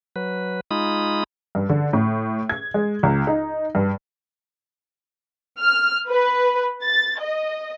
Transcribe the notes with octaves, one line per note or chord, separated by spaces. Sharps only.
F#3 B4
G#3 D#4 F4 B5 D#6
G2
D3
A2
G#6
G#3
C#2
D#4
G2
F6
B4
A6
D#5